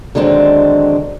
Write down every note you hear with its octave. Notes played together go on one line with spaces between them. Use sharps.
D3 D#3 F#3 G#3 C4 D4